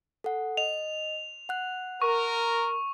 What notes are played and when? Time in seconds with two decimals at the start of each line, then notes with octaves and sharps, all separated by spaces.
0.24 A4 F#5
0.57 D#5 F7
1.49 F#5 F#6
2.02 A#4 C#6